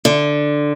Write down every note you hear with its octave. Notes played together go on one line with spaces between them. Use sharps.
D3